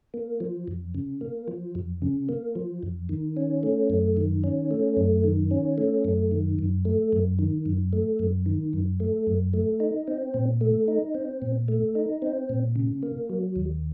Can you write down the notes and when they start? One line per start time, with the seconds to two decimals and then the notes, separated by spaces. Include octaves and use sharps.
0.14 A#3
0.40 F3
0.68 F2
0.94 C#3
1.21 A#3
1.48 F3
1.75 F2
2.02 C#3
2.29 A#3
2.55 F3
2.83 F2
3.09 D#3
3.37 C#4
3.63 A3
3.90 F#2
4.17 D#3
4.44 C#4
4.71 A3
4.97 F#2
5.24 D#3
5.51 C#4
5.78 A3
6.05 F#2
6.32 D#3
6.59 F#2
6.85 A3
7.12 F#2
7.39 D#3
7.66 F#2
7.93 A3
8.19 F#2
8.46 D#3
8.73 F#2
9.00 A3
9.27 F#2
9.53 A3
9.80 D#4
10.08 C4
10.34 A#2
10.61 A3
10.88 D#4
11.14 C4
11.42 A#2
11.68 A3
11.95 D#4
12.22 C4
12.49 A#2
12.76 C#3
13.03 A#3
13.29 F#3
13.56 D#2